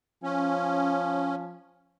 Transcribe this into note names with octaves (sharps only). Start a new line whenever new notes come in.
F3 C#4